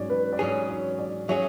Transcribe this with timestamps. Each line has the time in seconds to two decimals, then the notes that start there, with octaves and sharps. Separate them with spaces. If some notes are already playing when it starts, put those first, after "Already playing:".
Already playing: G#2 F#3 C#4 D5
0.10 B4
0.33 D5
0.39 G#2 F#3 C#4 G#4 C#5
0.69 C#5
0.99 D5
1.29 F#3 C#4 G#4 E5